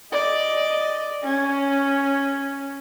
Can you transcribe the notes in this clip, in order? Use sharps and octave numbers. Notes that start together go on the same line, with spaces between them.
D5 D#5
C#4